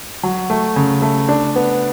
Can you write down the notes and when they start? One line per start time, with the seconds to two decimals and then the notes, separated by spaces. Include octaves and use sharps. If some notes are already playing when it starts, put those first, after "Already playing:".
0.23 F#3
0.50 A3
0.76 C#3
1.02 A3
1.29 D4
1.56 B3